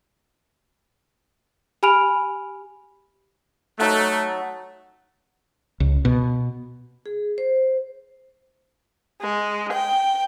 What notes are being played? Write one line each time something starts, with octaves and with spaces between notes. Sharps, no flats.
G4 G#5 B5 F6 D7 F7
F#3 A3 D#4 F#5
C#2
B2
G#4
C5
G#3
G5